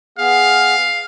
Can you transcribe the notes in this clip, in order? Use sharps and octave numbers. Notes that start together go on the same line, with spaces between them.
B3 G#4 F5